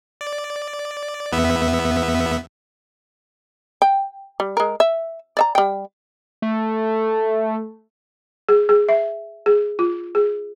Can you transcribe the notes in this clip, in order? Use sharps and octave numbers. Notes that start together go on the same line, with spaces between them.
D5
E2 B3 E5
G5
G3
G#3 A#4
E5
D5 E5 A#5
G3 G5
A3
G#4
G#4
E5
G#4
F4
G#4